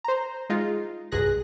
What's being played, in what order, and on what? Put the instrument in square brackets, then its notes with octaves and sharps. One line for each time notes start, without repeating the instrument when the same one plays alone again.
[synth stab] C5 A#5
G#3 D#4 F4
B1 G2 C3 G#4 F#6 A#6